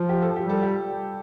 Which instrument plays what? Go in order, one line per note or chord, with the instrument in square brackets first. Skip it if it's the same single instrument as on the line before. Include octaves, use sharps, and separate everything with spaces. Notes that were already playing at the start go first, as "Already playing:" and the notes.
Already playing: [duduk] F3 [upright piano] F4
[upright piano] G4
A4
G4
[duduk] G3
[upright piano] A4
G4